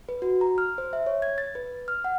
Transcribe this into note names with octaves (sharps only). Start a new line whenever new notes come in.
B4
F#4
A#5
F6
C5
E5
C#5
G#6
A6
B4
F6
F#5